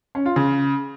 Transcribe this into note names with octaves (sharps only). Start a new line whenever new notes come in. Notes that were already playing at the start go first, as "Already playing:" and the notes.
C#4
F4
C#3